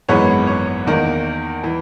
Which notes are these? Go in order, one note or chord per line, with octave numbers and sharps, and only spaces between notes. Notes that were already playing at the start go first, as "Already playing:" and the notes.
G#1 F#2 E3 G#3 B3 C#5
C#5
E2 D#3 A#3
E3